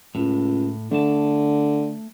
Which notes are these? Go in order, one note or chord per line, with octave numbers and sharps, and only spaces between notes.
C#2 A2
D3 A3 A5